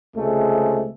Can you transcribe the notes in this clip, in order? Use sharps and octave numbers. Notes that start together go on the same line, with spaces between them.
C#2 C3 G#3 A3